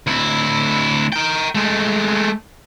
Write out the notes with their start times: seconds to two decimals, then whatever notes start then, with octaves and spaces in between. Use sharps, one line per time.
0.07 D2 E4
1.12 A#4 G5
1.55 G#3 A3